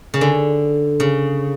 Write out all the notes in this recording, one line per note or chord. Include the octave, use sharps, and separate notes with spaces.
C#3
D3
C#3